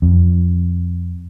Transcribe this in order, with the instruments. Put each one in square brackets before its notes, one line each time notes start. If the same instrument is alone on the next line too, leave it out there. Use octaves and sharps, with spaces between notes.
[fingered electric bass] F2